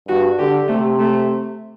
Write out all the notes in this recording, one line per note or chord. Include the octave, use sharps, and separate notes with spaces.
G2 F#4
D3 G4
C3 A3
A3